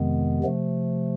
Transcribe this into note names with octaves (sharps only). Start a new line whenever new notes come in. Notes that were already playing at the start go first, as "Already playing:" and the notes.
Already playing: F2 C3 D#3 G#3 B3
C3 F3 A3